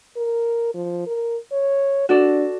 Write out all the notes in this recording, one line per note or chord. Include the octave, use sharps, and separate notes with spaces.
A#4
F3
A#4
C#5
D4 F#4 A4 D5